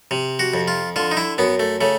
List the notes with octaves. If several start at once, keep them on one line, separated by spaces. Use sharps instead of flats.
C3
F#4
F2
F4
D3 F4
D#4
E4
F#2 B3
A3
C#3 A3